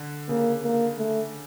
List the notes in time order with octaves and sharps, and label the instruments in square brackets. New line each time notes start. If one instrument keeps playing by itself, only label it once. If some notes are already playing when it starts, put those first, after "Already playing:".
Already playing: [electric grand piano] D3
[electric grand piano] C#3 [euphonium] A#3
[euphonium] A#3
A3